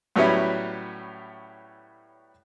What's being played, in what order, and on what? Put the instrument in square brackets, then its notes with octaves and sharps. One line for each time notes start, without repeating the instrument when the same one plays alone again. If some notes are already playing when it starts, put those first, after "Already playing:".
[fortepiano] A2 F#3 G3 B3 C#4 E4